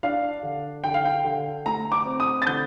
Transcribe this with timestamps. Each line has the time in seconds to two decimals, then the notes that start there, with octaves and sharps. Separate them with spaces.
0.03 D4 F5
0.43 D3
0.84 D3 G5
0.94 F5
1.05 G5
1.24 D3
1.66 A3 A#5
1.92 D6
2.05 C4
2.20 D#6
2.42 A6
2.46 D3 G6